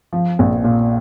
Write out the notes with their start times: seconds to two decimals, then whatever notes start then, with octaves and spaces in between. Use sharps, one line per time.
0.13 F3
0.39 A#1
0.64 A#2